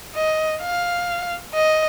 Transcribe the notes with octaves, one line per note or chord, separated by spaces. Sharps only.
D#5
F5
D#5